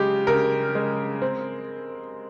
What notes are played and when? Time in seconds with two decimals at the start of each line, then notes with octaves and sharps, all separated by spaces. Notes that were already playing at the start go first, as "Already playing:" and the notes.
Already playing: C#3 G#3 G4
0.27 C#3 A#4
0.75 G#3
1.22 C4